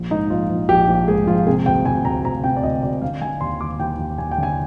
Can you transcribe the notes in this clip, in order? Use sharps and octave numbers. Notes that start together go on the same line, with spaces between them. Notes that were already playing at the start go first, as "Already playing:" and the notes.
Already playing: A#1
G#2 D#4
A#1 F4
A#1
A#1 G4
A#1
G#2 G#4
A#1 F4
C3 G#4
D2 G5
D2 G#5
D2 A#5
D2 A#5
C3 G5
D5
D2 D#5
D2 D5
D3 F5
D3 G#5
D#2 C6
D#2 D6
D#2 G5
D#2
D#2 G#5
G5
D3 G#5